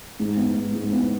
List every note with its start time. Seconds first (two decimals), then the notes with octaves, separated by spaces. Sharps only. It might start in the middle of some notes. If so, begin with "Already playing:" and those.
0.19 G#2
0.37 B3
0.56 G#2
0.74 G#2
0.92 B3